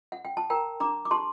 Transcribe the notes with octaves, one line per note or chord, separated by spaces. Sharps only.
F#5
G5
A5
A#4 G5 A#5
D4 A#5 D6
D6
G4 A5 C6